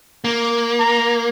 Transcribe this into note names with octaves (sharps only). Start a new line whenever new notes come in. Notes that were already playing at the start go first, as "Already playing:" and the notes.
A#3
A#5